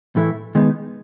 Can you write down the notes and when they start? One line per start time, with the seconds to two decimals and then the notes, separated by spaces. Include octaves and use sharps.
0.16 A2 E3 A3 E4
0.55 D#3 G#3 B3 D#4